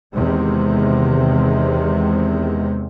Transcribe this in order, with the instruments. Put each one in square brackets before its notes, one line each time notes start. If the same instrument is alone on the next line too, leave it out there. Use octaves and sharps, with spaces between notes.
[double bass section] E2 C3 D#3 G#3